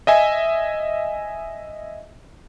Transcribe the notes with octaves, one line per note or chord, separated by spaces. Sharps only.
D#5 E5 G#5